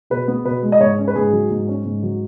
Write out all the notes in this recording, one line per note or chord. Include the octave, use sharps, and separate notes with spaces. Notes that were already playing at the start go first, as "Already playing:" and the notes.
B2 B4
B3
B2 B4
G#3
D#5
G#2 C#5
C#4
B4
G#2 G#4
F#3
G#2
C#4
G#2
F#3